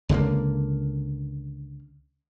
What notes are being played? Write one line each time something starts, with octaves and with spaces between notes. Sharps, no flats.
C#2 D3 A3 A#3